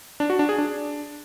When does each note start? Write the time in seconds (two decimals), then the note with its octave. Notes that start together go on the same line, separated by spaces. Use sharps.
0.20 D4
0.30 F#4
0.39 D4
0.49 G#4
0.58 D4